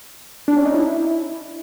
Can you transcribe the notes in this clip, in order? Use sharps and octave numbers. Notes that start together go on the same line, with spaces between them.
D4
C#4
D#4
E4